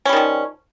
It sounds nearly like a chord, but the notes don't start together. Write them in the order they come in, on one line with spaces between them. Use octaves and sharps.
C#4 G3 D#3 F3